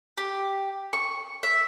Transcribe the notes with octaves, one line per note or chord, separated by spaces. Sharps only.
G4
C#6
E5